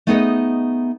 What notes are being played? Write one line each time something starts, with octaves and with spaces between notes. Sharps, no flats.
A3 B3 D#4 G#4 B4 D#5